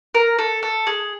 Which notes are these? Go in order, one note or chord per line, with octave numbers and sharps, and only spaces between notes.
A#4
A4
A4
G#4